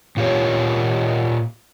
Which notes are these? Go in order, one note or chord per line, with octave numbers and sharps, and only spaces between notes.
A#2 F4 G4 C#5